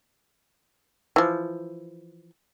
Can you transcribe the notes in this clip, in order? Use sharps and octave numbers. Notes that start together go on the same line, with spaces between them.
E3 F3